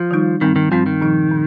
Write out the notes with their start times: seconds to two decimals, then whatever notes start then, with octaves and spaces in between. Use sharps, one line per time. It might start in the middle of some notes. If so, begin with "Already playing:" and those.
Already playing: F3
0.11 D#3 G3 D#4
0.41 G2 D#3 G3 C4
0.56 D#3
0.72 G2 F3 G3 C4
0.86 D#3
1.01 A#2 F3 D#4
1.31 A#2